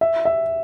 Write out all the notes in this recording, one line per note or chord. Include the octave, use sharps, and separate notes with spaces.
E5
E5